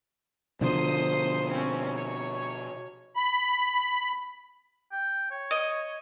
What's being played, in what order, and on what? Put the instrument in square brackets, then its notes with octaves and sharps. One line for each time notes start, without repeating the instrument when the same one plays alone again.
[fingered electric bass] B2 D3 F3 [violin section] C5 C6 D#6
[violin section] C4 C#4
C#5
[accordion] B5
[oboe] G5
C#5
[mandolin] D#5